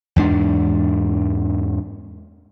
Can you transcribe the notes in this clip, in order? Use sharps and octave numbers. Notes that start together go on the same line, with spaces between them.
E2 G#2 D4